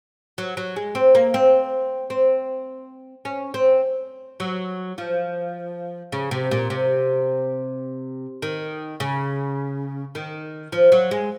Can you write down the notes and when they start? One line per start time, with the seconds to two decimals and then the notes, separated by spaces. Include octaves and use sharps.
0.38 F#3
0.57 F#3
0.76 G#3
0.95 C4
1.15 A#3
1.34 C4
2.10 C4
3.25 C#4
3.54 C4
4.40 F#3
4.98 F3
6.12 C#3
6.31 C3
6.51 A#2
6.70 C3
8.42 D#3
9.00 C#3
10.15 D#3
10.72 F3
10.92 F#3
11.11 G#3